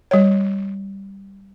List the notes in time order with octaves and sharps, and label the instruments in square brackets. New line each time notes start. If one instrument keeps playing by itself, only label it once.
[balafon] G3 C#5